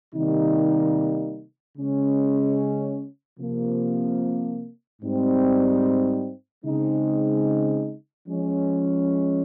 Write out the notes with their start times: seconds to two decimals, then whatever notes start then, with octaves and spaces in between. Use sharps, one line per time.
0.14 C3 D#3 G3 A#3 D#4
1.77 C#3 G#3 C#4
3.39 C3 F3 A#3
5.02 G#2 G3 C4 D#4
6.65 C#3 G#3 C4 D#4
8.27 F3 G#3 C#4